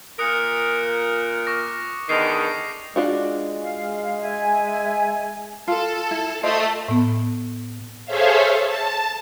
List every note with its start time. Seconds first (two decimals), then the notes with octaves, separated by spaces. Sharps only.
0.19 A#2 A#4 D#6 F#6 C#7
1.47 C#6 D6 A#6
2.09 E2 D3 D#3 C7 F7
2.96 G#3 D4 F4 F#4
3.63 F5
4.22 E5 G#5
5.68 F4 A4
6.11 E4
6.43 A3 F4 C5 D#5
6.88 A2 B3
8.06 G#4 A4 C5 C#5 E5 F5
8.63 A5